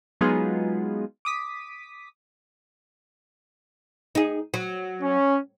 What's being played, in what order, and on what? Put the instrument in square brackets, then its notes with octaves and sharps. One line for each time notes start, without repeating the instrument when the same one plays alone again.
[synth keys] F#3 G#3 B3 D#4 F4 G#4
D6 D#6 B6
[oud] D#4 G#4
F#3
[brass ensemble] C#4